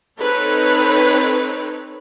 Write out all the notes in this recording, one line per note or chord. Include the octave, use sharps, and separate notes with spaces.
C4 D#4 A4 B4 C#5